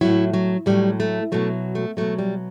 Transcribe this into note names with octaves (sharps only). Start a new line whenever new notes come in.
A2 F#3 E4
F#3
A2 F#3 G3
A3
B2 F#3 A3
A3
B2 F#3 A3
G3